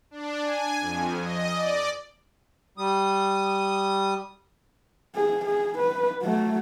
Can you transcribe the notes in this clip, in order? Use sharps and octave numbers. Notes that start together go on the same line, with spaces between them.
D4
G#5
F2
D#5
D5
G3 D#6
G#4
G#4
B4
F#3 A3